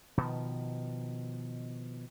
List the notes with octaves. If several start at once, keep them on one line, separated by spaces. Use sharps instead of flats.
B2 D#3 F3